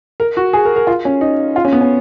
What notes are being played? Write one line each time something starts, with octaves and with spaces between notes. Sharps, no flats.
A#4
F#4
G#4
A#4
A#4
F4
C#4
D#4
F4
C#4
B3
C#4